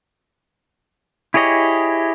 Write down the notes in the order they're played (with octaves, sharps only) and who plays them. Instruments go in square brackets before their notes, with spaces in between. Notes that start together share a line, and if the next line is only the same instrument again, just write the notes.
[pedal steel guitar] E4 G4 G#4 C#5 D#5